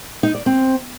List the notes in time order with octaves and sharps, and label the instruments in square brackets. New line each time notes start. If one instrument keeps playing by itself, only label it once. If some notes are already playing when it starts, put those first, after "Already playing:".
[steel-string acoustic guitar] D#4
D5
C4